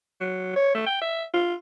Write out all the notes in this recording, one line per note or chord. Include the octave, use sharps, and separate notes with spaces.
F#3
C#5
A3
G5
E5
F4